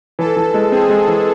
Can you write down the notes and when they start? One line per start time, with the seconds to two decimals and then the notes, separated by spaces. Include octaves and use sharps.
0.19 E3 A4
0.36 E3
0.54 G#3
0.72 C4 G#4
0.89 G#3
1.08 E3